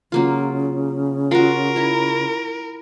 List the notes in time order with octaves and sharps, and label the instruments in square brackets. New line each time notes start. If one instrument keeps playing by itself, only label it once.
[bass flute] C#3 [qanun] F#3 A#3 F4
[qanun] F4 F#4 [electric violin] A#4
[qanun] E4 C#5